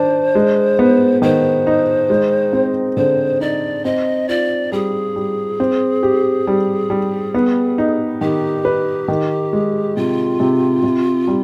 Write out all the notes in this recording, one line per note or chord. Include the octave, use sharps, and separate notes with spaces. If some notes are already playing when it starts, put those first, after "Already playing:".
Already playing: D#3 D4 C5
G#3
B3
D#3 C5
D#4
G#3
C4
D3 C5
D#4 D5
C4 D#5
F4 D5
G3 G#4
G3
C4
G4
G3
G3
B3
D#4
D#3 G4
B4
D#3
G#3
C3 F4
C3
C3
G3